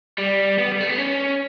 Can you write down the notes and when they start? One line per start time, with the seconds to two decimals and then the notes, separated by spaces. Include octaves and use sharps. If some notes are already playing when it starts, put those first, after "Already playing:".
0.18 G3
0.58 B3
0.71 G3
0.80 A3
0.89 B3
0.98 C#4